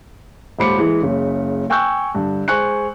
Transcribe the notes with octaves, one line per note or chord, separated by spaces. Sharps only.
D#1 G#2 C5 B5 D6 C#7
E3 G#3
F#1 C#3
G5 G#5 C#6 E6 F#6 G6
G2 D3
G#3 C5 G#5 C#6 F#6 C#7